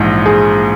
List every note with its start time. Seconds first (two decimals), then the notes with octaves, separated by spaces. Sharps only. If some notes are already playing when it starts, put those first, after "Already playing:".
Already playing: A#1 G#2 E3
0.26 G#4